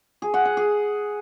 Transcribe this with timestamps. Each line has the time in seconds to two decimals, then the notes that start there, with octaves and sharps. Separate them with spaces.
0.22 G#4
0.34 F#5
0.45 F#5
0.57 G#4